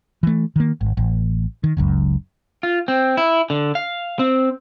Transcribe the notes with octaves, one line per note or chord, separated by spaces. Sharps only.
E3 A3
D#3 A#3
G#1
A1
D#3
F#1 C#2 F#2
F4
C4
E4
D3
F5
C4